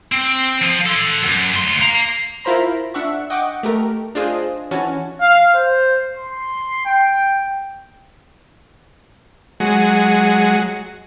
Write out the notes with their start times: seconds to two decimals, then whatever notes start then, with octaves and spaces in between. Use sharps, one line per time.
0.12 C4
0.61 F3
0.86 A4 C6
1.22 F#2 F#3
1.53 D2 C6
1.81 F5 A#5
2.44 E4 F4 A#4 C5 A#5 B5
2.94 D4 E5 F#5 C#6
3.30 D#5 F#5 G5 C#6 D6
3.63 A3 G4 A#4
4.15 D4 F4 G#4 C5 D#5
4.71 E3 C#4 F#4 A5
5.21 F5
5.55 C5
6.17 C6
6.86 G5
9.60 F#3 G#3